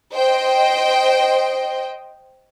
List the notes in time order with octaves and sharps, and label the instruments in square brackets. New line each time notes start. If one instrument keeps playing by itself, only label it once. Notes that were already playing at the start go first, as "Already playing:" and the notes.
[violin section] C5 D#5 G5